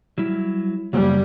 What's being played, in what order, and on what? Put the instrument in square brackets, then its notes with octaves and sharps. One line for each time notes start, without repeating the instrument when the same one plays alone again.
[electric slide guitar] F#3 G3 E4
[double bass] F#2 G3 [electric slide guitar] C#3 A#3